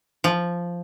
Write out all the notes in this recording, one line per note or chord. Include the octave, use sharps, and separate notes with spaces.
F3